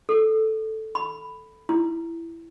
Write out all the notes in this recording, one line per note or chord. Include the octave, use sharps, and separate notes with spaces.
A4
B5
E4